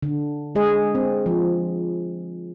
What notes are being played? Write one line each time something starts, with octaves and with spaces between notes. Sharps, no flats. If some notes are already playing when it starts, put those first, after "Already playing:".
D3
G#3 G#4 D#5
C4
F3